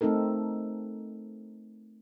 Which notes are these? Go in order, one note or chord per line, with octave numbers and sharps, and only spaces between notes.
A3 C4 D#4 A4 A#4